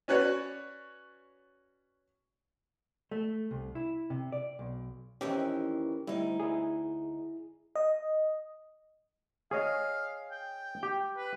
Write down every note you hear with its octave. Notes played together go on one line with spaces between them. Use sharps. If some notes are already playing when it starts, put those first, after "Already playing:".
C#4 F#4 B4 C#5 D5
A3
C2
E4
C3
D5
B1
F2 D#3 E3 C#4 G4
D2 G3 D#4 E4
E4 G#4
D#5
G#4 C#5 D#5 F5
G5
G4
B4